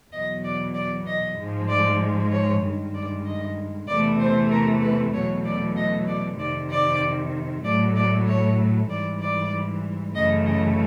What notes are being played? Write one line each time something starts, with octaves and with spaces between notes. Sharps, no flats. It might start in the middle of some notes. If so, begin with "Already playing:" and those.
E2 B2 F#3 D#5
D5
D5
D#5
G#2 F3 G#3
D5
C#5
G2 D#3 G#3
D5
D#5
E2 C3 E3 A3 D5
C5
A#4
B4
E2 B2 F#3 A3 C#5
D5
D#5
D5
F2 C3 D#3 D5
D5
A2 F#3 A3 D5
D5
C#5
G#2 E3 G3 D5
D5
F#2 C#3 E3 A3 D#5
D#5